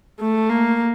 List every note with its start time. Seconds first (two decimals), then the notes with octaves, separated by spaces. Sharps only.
0.20 A3
0.50 A#3